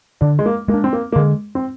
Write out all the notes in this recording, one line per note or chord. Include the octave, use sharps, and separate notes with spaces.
D3 D4
G#3
A#3
G#3 A#3
D4
C4
A#3
A#3
D3 G#3
C4